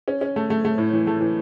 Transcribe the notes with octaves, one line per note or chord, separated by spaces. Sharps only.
C#4
C#4
A3
A3
A3
A2
E3
A3
E3